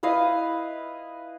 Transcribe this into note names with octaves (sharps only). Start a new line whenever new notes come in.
E4 B4 D#5 F5